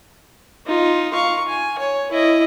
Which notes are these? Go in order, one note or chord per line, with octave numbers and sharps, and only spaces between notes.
D#4 F4
F5 C#6
G#5
C#5
E4 D#5